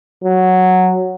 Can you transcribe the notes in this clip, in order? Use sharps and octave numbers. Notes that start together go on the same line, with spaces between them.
F#3